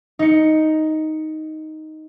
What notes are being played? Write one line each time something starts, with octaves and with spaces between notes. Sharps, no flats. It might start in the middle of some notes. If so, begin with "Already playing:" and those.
D#4 C#7